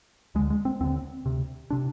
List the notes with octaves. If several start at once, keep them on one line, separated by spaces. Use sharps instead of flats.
D2 D3 G#3
G#3
C4
D#2 D3 C4
D2 C3
C3 D4